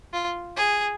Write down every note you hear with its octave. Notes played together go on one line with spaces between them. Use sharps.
F4
G#4